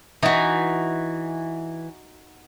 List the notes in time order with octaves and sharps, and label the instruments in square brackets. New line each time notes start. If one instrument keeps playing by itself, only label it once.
[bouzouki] E3 [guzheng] D#4 F#4